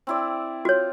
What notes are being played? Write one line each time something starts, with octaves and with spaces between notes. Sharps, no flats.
C4 E4 D5
F4 F#4 C#5